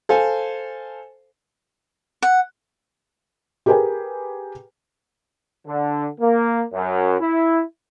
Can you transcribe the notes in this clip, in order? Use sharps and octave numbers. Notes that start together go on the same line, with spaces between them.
A4 C5 F5 G#5
F#5
G4 G#4 A#4 B4 G5 G#5
D3
A#3
F#2
E4